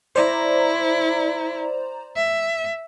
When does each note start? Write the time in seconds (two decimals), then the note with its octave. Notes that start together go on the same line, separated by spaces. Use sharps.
0.16 E4 C5 D5 A#5
2.16 E5